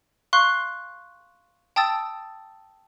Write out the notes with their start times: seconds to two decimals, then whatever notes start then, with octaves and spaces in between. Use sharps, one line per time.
0.33 F5 C6 C#6 F#6
1.76 G5 A5 D#6 E6 A6